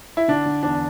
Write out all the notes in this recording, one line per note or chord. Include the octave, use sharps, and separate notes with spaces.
E4
D3 D4
D3
E2 D4